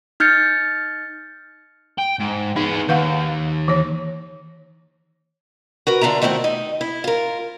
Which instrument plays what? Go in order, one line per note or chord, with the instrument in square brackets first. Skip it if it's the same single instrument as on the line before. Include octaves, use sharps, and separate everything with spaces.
[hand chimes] D#4 F6 G6 A6 C#7
[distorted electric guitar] G5
G#2
[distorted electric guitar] B3 G#4 [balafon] D#4
[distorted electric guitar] D#2 [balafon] B4 F5 F#5
[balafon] E3 C#5
[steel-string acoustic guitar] F#4 A#4 B4
D3 D4 F4 E5 A#5
D#3 A3 C4 E4 F#4
D#4
E4
F4 A#4